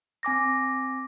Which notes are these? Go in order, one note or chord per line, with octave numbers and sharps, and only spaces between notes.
C4 G#5 D6 A#6